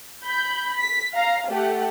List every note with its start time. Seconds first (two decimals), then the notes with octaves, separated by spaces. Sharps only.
0.25 B5 G6
0.76 B6
1.14 F5 A#5
1.47 A3 G4 F#5